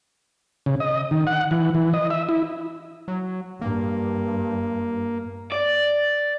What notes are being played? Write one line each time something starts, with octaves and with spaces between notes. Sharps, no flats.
C#3
D#5
D#3
F#5
E3
E3
D#5
E5
E4
F#3
G2 A#3
D5